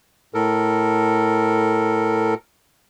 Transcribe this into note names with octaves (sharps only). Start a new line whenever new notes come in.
A2 A4 A#4